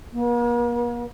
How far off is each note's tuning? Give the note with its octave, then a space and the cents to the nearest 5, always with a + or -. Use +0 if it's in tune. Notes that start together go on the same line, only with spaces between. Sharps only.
A#3 +45